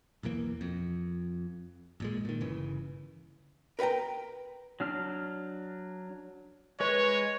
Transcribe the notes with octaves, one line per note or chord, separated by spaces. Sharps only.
B1 E2 E3 A#3
F2
A1 A#2 G#3
A#2 D#3
G1 C#3 E3
A#4 B4 F#5 G5 A#5
F#3 D4 F6
G#3 B4 C#5